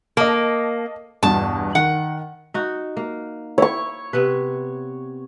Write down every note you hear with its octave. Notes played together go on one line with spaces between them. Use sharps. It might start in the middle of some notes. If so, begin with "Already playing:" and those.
A#3 D#5 A5
E2 G2 B2 A5
D#3 F#5
D#4 F#4
A#3
E4 C#5 C#6
C3 B3 B4